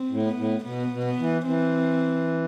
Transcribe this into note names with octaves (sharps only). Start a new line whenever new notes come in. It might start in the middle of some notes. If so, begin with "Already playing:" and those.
Already playing: C4
A2
B3
A2
B2 B3
B2
B3
E3
E3 C4